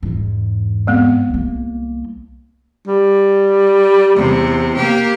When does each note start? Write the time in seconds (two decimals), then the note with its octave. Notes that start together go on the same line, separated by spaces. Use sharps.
0.03 E2 G#2
0.87 G#3 B3 C4
1.30 C2 A#3
2.87 G3
4.15 E2 C3
4.76 A#3 G4